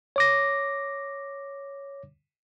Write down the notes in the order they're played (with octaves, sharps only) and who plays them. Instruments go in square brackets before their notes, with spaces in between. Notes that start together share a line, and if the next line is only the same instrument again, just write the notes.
[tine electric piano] C#5 D6 A#6